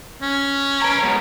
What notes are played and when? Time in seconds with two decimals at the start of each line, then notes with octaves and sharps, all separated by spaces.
0.22 C#4
0.82 B4 A#5
1.02 F#3 G#3 B3